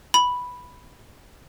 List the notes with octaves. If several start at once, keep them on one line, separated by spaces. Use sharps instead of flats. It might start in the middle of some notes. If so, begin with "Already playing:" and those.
B5